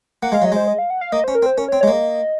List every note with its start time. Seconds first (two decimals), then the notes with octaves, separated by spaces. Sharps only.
0.22 A#3 F#5
0.32 G#3 F5
0.42 F#3 D#5
0.52 G#3 C5
0.68 D#5
0.79 F5
0.90 F#5
1.01 F5
1.12 A#3 D#5
1.24 C#4 C5
1.35 A#4
1.42 C4
1.46 C5
1.58 C#4 A#4
1.68 C#5
1.72 C4
1.81 G#3 C#5
1.88 A#3 D#5